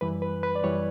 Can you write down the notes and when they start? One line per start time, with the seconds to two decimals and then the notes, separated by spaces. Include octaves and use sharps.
0.01 F#2 E3 G3 B4
0.22 B4
0.43 B4
0.55 D5
0.64 F#2 E3 G3 C#5